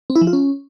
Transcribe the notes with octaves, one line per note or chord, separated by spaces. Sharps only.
C4
E4
F3
F4
C#4